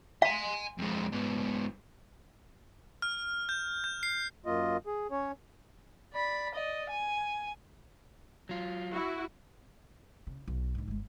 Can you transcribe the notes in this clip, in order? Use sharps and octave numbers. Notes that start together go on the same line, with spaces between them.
F5 G#5 C6
F2 G#3
G#2 B3
F6
G6
G6
C7
F#2 A#3 F4 D#5
G#4
C#4 C#5
D5 B5
D5 D#5
G#5
F#3 F4
E4 F#4
C#3
B1
G#2 D3
G1 G#3